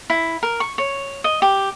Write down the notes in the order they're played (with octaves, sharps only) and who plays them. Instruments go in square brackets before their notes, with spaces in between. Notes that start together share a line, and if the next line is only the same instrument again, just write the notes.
[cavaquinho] E4
A#4
C#6
C#5
D#5
G4